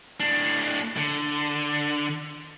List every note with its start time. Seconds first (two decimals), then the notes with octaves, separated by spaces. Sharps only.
0.20 A2 D4
0.97 D3